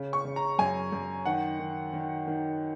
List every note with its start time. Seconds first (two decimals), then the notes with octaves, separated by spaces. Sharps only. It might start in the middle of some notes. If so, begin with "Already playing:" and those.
Already playing: C#3
0.13 C#6
0.25 C#3
0.36 A#5
0.59 F#2 G#5
0.92 F#2
1.25 D#3 F#5
1.59 D#3
1.93 D#3
2.27 D#3